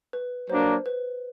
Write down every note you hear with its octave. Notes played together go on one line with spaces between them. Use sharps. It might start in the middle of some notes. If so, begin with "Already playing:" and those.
B4
F#3 A#3 D4 C5
B4